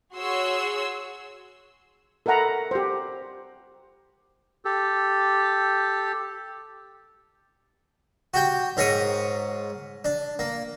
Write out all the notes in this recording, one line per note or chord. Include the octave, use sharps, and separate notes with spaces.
F#4 G#4 C#5 C6 E6
A4 A#4 E5 F#5 A#5 B5
G4 C5
G4 A4
F#4 G4 G5
G#2 A#4 C#5 F#5 D#6
D4
A#3